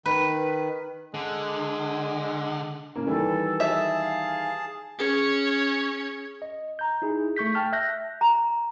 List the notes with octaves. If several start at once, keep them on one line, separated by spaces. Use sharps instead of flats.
D#3 B4
D3 G#3
A2 C#3 A#3
D#3 E3 G3 A4
G#4 E5 A5
F5
C#4 G#4 C#5
D#5
A#5 G6
D#4 E4 G#4
A3 C#6 G6 B6
G5 A5 F6 G6
E5 F#6 G6 A#6
A#5